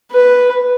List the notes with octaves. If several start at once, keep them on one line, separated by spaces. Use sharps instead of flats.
B4